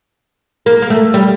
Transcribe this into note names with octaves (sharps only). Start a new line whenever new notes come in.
A#3
A#3
A3
G3